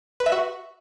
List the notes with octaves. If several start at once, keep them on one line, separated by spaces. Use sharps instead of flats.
B4
E5
F#4